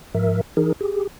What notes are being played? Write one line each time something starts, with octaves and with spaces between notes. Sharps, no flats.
G#2 F3 A#4 E5
E3 D#4 G#4 A#4
G4 G#4